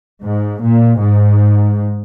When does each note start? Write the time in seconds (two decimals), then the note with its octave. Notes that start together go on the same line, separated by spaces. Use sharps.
0.22 G#2
0.60 A#2
0.99 G#2